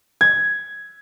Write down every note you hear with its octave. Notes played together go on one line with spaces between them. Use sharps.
G#6